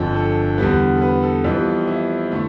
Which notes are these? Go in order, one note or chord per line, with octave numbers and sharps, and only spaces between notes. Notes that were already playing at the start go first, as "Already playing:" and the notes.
Already playing: G1 F2 D3 F3
A4
E2 D3 G3 B3
A4
B4
A4
F2 E3 G3 B3
F4
E4
D3 A3